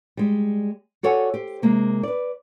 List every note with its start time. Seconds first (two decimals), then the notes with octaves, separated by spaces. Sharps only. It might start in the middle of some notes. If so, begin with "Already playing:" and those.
0.17 G3 G#3
1.03 F#4 A4 C#5 D5 F#5 G#5
1.34 G4 C5
1.62 C3 G#3 A#3 C5
2.03 B4 D5